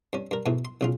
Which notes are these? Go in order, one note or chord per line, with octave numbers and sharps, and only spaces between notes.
G2 C#4
G2 A#4
G#2 B2 E3 A3
C6
B1 C#3 F4